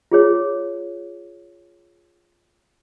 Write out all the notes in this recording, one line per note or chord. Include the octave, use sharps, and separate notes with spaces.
F4 G#4 C#5